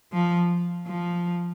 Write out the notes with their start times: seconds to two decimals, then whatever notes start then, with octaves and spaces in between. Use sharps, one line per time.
0.13 F3
0.87 F3